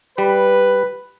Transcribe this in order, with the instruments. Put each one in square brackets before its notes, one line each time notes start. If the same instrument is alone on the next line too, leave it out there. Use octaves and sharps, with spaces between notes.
[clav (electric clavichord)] G3 [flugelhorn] B4